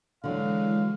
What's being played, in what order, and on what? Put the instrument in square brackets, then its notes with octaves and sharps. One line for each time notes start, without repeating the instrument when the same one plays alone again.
[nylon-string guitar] D3 F#3 [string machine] E3 G#3 [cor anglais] F5